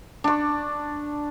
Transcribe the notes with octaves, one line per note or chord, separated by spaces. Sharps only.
D4 C#6